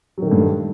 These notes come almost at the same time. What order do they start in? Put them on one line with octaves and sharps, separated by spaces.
F#3 D#3 A3 G2